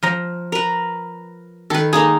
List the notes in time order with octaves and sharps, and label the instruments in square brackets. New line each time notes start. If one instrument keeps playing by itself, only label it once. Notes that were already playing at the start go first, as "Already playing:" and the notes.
[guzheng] F3 A#5
[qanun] A#4 B4
[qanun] D#3 B4 [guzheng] A4
[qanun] G#3 A#3 D#4 [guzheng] G#4